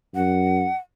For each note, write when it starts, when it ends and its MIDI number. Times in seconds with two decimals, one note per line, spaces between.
0.15 0.67 42
0.15 0.76 78